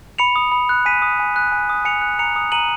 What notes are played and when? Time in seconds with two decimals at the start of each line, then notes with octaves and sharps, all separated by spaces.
0.18 B5 C#7 F7
0.36 D#6
0.52 B5
0.69 F#6
0.85 G#5 B6 D#7
1.02 D#6
1.20 G#5
1.36 F#6
1.52 G#5
1.69 D#6
1.85 G#5 C#7 F7
2.02 F#6
2.19 A#5 C#7 F7
2.36 D#6
2.52 A#5 D#7 F#7